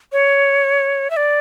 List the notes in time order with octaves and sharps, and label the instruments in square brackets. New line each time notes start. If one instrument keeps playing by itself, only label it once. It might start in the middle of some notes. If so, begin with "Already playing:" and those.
[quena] C#5
E5
D5